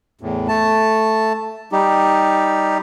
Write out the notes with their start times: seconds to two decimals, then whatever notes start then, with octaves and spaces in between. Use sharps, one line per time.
0.21 E2 A2
0.48 A3 A5
1.72 G3 D#4 G4